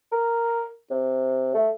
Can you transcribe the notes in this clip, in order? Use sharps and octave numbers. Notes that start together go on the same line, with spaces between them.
A#4
C3
A3